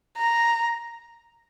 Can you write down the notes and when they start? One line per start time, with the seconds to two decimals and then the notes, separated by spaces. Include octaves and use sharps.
0.17 A#5